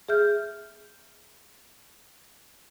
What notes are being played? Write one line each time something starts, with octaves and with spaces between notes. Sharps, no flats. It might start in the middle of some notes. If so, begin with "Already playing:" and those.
G#4 E5 F6 G6